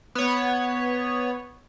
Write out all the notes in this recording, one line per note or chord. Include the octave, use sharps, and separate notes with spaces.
B3 C#5